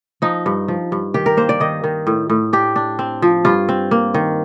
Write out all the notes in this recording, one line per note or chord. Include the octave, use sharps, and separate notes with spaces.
F3 D#4
G2
F3
G2
D#3 G4
A#4
A#3 C5
D5
D#3 D#5
D#3
A2
A2
D4 G4
D4
C4
F3
G2 F4
C4
A#3
D#3